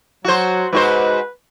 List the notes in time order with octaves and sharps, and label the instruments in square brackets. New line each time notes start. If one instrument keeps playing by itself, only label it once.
[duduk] F#3 [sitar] F#4 C5
[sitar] G#2 F#4 C5 [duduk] B4